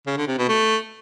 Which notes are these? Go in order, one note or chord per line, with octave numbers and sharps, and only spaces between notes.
C#3
D3
C3
B2
A3